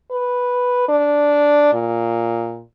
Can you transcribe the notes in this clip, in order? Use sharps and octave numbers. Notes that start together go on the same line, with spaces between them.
B4
D4
A#2